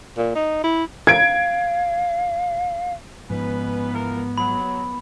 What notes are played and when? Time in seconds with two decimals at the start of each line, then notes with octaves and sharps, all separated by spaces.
0.17 A#2
0.35 D#4
0.64 E4
1.07 F5 G#6 D7
3.30 G#2 F3 B3 C#4 D#4 B4
3.93 E3 F4 A#4
4.38 F#3 B5